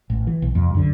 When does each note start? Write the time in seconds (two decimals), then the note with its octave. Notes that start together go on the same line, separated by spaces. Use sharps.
0.10 A1
0.27 E3
0.42 B1
0.55 C2 F2
0.75 F#2 D3